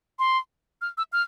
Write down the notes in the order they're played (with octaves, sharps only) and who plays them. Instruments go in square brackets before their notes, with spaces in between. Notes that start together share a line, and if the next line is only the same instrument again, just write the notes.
[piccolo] C6
F6
E6
F6